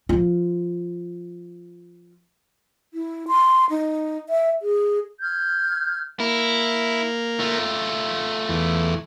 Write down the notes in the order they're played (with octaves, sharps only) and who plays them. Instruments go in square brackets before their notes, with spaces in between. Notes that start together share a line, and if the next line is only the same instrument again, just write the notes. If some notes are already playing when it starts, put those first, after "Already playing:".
[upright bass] F3 F4
[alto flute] E4
C6
D#4
E5
G#4
[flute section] F6 G6 G#6
[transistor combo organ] A#3 [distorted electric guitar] E4
[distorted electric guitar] A3 F4
[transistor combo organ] E2